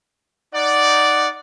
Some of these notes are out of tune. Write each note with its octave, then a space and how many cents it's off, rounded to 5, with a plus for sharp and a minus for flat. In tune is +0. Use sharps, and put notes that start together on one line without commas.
D#4 +0 D5 -5 F#5 +0